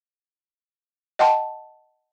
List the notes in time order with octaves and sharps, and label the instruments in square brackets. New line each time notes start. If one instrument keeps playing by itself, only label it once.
[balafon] D#5 F#5 G5 A5 C6